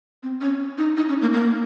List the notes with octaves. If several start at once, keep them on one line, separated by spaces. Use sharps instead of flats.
C4
C#4
D#4
D#4
C#4
A#3
A#3